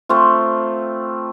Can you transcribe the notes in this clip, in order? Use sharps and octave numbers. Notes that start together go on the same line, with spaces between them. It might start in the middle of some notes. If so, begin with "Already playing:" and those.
A3 C4 F4